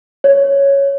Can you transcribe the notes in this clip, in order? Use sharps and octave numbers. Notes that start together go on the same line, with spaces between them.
C#5